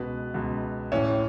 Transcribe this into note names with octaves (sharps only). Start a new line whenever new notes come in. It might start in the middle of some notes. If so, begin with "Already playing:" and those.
Already playing: C#2 B2 B4
C#2 B2
A1 A2 E3 C#4